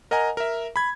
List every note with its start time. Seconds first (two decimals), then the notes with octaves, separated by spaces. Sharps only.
0.11 A#4 D#5 F#5 G#5 A#5
0.37 A#4 E5
0.76 B5 G#6